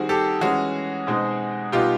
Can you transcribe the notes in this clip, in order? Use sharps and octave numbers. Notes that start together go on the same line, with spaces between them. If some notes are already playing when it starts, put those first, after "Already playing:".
Already playing: D#3 G3 C4 F#4 G#4
G4 A4
E3 G#3 C#4 F#4 G#4
B2 G#3 C4 D#4
B2 G3 B3 D#4 F4 G4